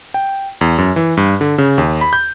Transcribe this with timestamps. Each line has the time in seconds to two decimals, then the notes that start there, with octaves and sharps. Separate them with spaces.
0.14 G5
0.61 E2
0.78 F#2
0.96 E3
1.17 G2
1.41 D3
1.58 C#3
1.78 D#2
2.01 B5
2.13 G6